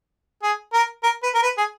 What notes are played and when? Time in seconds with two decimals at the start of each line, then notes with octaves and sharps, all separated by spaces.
0.43 G#4
0.73 A#4
1.03 A#4
1.23 B4
1.34 A#4
1.43 B4
1.58 G#4